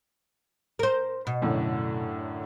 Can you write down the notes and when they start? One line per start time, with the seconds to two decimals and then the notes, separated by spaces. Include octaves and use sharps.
0.79 A#4 C5
1.27 B2
1.42 F#2 A2 D3